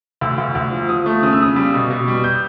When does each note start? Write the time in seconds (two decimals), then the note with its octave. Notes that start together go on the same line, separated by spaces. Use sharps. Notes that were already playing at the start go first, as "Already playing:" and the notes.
0.21 D2 E6
0.38 D2
0.55 D2
0.71 F3
0.89 F3 D#6
1.06 A3
1.23 C#3 D#6
1.33 E6
1.40 C#3 D#6
1.56 G3
1.74 B2
1.90 B2
2.08 G3
2.24 G6